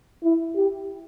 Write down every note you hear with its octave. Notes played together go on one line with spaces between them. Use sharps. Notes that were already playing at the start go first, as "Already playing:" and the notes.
E4
G4